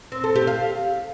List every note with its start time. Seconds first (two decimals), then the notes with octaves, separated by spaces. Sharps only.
0.12 C4
0.24 A4
0.36 G4
0.47 F5